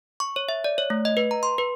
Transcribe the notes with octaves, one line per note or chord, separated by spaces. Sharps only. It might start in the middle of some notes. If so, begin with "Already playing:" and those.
C#6
C#5
E5
D5
C#5
A3
D#5
B4
A#5
C6
B4